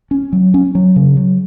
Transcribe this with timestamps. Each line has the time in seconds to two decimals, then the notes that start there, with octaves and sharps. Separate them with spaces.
0.11 C#4
0.33 F#3
0.54 C#4
0.75 F#3
0.96 C#3
1.17 F#3